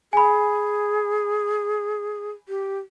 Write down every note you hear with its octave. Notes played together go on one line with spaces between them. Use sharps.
G#4 G#5 B5
G4